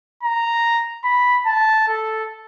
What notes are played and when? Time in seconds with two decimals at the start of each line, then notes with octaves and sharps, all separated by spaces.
0.23 A#5
1.04 B5
1.46 A5
1.88 A4